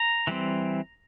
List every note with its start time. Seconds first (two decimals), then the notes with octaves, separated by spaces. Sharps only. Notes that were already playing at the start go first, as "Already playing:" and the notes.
Already playing: A#5
0.27 E3 G3 C4